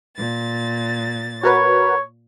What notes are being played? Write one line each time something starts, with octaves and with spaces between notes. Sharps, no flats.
A#2 A6
F#4 A#4 B4 C#5